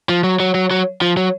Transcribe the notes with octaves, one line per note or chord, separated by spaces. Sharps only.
F3
F#3
F#3
F#3
F#3
F3
F#3